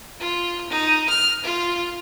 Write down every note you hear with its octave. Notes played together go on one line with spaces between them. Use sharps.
F4
D#4
F6
F4